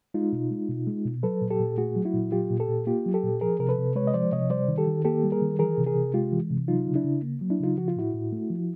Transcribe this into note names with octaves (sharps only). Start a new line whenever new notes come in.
G#3 D#4 F4
B2
G#3
B2
G#3
B2
F#3 A4 B4
A#2
G4 A4
A#2
A3 F#4 G#4
F#3
E4 F#4
A#2
F#3 F4 G4
A#2
G4 A4
A#2
A#3 F4 G4
F#3
G4 A4
A#2
F3 G#4 A#4
C3 A#4
A4 B4
C3
G#3 B4 C#5
D#5
F3 C5 D5
C3 C#5 D#5
G3 C5 D5
D#3
G4 A4
D#3
A#3 G4 A4
G3
G#4 A#4
D#3
E3 G#4 A#4
C3
G#4 A#4
C3
G#3 F4 G4
E3
C3
F#3 D#4 F4
C#3
D4 E4
C#3
A#3
F#3
D4 E4
C#3 D#4 F4
F3 F#4
F4
A2 E4 F#4
A2
A3
F3